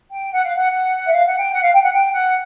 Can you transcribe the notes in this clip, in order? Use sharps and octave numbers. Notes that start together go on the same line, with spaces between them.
G5
F#5
F5
F#5
F#5
E5
F5
F#5
G5
F#5
F5
G5
F#5
G5
F#5